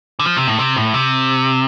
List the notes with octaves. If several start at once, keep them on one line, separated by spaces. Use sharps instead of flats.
D3
F3
C3
A2
C3
A2
C3